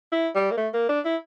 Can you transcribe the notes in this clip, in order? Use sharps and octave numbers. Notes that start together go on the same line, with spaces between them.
E4
G3
A#3
A3
A#3
D4
E4